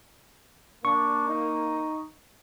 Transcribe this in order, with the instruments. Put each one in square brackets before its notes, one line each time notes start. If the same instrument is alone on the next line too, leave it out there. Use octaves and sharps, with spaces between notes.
[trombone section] A#3 [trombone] D4 [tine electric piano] C#6
[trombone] D#4